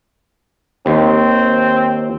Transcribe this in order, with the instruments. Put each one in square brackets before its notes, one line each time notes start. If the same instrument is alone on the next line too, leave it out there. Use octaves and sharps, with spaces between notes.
[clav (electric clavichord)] D#2 [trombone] C4